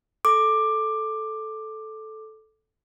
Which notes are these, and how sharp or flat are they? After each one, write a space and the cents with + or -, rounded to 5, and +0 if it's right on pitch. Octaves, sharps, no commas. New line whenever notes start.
A4 -10 D6 +10